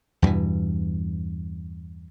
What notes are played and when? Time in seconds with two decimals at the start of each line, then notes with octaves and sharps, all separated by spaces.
0.22 E2 G2 B2 E3